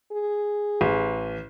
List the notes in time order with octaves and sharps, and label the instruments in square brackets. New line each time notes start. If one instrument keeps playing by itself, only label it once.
[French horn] G#4
[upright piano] A1